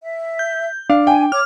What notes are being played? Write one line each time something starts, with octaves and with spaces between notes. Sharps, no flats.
E5
G6
D4 F5
G5 G#5
C#5 D6 F6